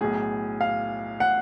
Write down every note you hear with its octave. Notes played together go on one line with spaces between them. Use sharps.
B1 A2 G#4
F5
F#5